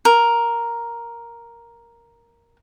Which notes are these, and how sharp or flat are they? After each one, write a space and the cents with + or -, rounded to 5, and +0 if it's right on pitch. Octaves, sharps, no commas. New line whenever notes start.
A#4 +5